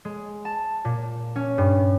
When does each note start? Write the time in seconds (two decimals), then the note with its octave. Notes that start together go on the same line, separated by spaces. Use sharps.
0.05 G#3
0.45 A5
0.85 A#2
1.36 C#4
1.58 G2